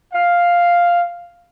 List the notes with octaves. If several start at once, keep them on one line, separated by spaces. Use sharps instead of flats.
F5